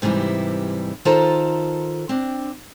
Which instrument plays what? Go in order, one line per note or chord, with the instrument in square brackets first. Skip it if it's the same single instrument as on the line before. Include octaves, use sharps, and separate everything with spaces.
[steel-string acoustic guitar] G#2 C3 E3 G3 E4
D#3 F4 A4 C5 A5 A#5
C4 D4